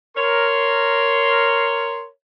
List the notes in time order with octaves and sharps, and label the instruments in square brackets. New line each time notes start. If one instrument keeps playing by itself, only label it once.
[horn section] A#4 C#5 C6